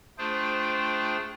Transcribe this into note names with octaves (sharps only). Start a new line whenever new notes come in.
A3 D4 F4 G#4 C5 G5